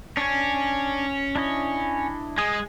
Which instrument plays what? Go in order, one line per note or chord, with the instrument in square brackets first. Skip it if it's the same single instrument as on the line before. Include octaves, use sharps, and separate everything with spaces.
[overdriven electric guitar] C#4 [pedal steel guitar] D4 C#5
[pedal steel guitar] D4 E4 D#5
[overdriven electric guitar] G#3 [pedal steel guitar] G#5 D#6